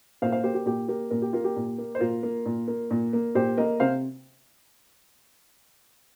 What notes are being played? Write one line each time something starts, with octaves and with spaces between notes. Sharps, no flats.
A#2 C5 F5
C5 F5
A#3 G4 C5
G4
A#2 G4
A#3 G4
A#2 A#4
G4
A#3 F4
G4
A#2
A#3
C5
A#2 F4 A#4
A#3
A#2
A#3
A#2
A#3
A#2 G4 C5
A#3 A#4 D#5
C3 C5 F5